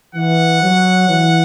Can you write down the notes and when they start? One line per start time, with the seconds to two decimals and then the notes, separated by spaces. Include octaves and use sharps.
0.15 E3 F#5
0.62 F#3
1.09 E3